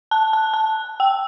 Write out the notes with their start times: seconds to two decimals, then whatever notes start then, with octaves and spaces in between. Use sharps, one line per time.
0.11 A5
0.33 A5
0.54 A5
1.00 G5